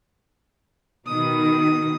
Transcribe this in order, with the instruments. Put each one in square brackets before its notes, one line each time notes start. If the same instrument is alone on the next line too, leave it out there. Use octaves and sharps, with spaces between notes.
[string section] B2 D#3 [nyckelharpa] D#6